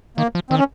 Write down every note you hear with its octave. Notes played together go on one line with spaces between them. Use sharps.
D#3 A#3
F3
D#3 C4
C#4